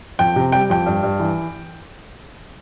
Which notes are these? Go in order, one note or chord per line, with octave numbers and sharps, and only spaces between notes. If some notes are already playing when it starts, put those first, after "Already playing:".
F2 G5
C3
G3 G5
F2 G5
G2
G2
E3